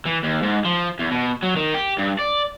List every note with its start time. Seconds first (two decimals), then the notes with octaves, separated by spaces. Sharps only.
0.06 E3
0.23 D#2
0.42 G#2
0.65 F3
0.99 E2
1.11 B2
1.43 F#3
1.56 D#3
1.74 G4
1.99 G2
2.19 D5